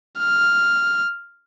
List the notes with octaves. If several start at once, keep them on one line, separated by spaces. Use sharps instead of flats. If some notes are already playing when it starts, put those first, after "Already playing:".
F6